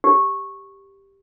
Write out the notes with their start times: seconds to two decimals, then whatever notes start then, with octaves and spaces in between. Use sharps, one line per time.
0.04 G4